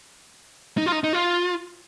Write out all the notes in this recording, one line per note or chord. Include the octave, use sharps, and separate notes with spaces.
D#4
F4
D#4
D#4
F4